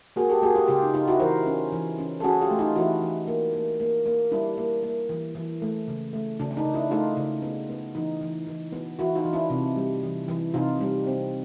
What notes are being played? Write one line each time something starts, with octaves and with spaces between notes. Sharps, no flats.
A#3 F#4 G#4
G4 A4
A#3 F#4 G#4
F4 G4
C#3 F4 G4
D#4
C#3 D#4 F4
E4 F#4
E3 A#4 C5
C#4
E3
C#4
A4
C#4 F#4 G#4
F4 G4
A3
D#4 F4
E3 E4 F#4
E3
A#3
A#3
A#3
A#3
G3 D4 E4
A#3
A#3
E3
E3
A3
C#3
A3
C#3 D4
D4
D#4
C#3
D4 E4
A3 D#4 F4
C#3
B3
B3
E3 D#4
E3
E3
B3
E3 E4 F#4
D#4 F4
E3
D4 E4
C3
G3
E3
E3
C3 D#4 F4
G3
C4